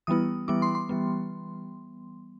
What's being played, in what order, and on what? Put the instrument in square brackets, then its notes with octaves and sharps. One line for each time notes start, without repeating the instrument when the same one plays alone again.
[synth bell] E3 G3 B3 E4 D#6
E3 G3 B3 E4 D6
C6
C6
E3 G3 B3